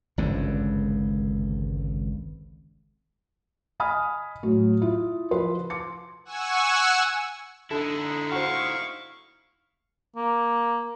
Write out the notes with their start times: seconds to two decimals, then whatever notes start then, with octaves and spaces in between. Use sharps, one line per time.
0.18 G#1 C#2 G2 D3
3.80 D#5 G#5 B5 D#6 F6
4.43 A2 F#3
4.82 E4 F4
5.31 F3 B4 C6
5.70 C6 D6 C#7
6.25 F#5 G#5 C#6 E6
7.71 D3 D#4 E4 A4
8.32 F#4 C5 F5 C#6
10.16 A#3